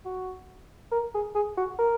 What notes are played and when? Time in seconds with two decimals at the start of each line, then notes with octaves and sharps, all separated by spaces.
0.05 F#4
0.92 A#4
1.14 G#4
1.35 G#4
1.57 F#4
1.79 A#4